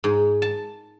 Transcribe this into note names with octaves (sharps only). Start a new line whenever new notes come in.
G#2
A5